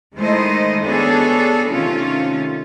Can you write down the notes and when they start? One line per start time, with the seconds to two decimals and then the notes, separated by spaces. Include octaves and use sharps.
0.16 D#3 G#3 A3 E4 C5 D#5
0.83 B3 D4 F#4 G#4 A4 C#5
1.68 C3 D#3 A3 C#4 F4